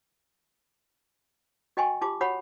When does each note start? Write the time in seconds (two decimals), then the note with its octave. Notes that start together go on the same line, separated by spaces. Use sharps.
1.77 F#4 D#5 G5 G#5 C6 C#6
2.02 F4 G4 A5 C6 D6
2.21 F#4 C#5 F#5 B5 D#6